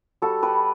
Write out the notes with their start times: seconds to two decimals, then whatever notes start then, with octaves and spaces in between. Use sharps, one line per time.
0.22 G3 F#4 A4
0.43 G4 B4